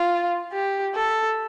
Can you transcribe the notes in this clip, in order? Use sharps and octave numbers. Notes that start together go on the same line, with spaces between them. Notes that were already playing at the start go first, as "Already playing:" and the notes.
Already playing: F4
G4
A4